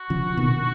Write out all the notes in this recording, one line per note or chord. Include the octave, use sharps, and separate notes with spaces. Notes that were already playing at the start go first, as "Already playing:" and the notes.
Already playing: F#4
C#3 F3
B2 D#3